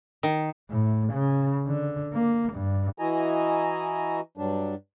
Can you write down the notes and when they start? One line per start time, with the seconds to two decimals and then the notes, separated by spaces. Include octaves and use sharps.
0.23 D#3
0.71 A2
1.13 C#3
1.67 D3
2.14 A#3
2.53 G2
2.99 E3 E4 F#4 D#5 G#5 A#5
4.37 G2 F#3 G3 D4